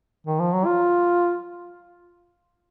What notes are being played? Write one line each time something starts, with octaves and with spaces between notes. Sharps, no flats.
D#3
F3
F#3
F4